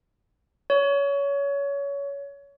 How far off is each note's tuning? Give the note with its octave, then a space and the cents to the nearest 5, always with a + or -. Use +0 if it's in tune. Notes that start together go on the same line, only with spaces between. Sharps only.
C#5 +25